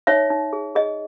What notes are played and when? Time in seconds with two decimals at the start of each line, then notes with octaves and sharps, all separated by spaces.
0.07 D#4 C#5 E5
0.30 D#4
0.53 G#4
0.75 G#4 D#5